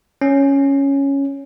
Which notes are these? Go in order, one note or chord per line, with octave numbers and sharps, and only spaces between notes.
C#4